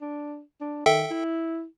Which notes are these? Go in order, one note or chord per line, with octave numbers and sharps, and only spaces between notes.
D4
D4
D#3 A4 E5 G5
E4